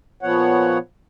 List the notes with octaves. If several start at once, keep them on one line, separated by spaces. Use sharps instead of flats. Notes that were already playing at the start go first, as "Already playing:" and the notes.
A#2 F3 B3 C#5 F#5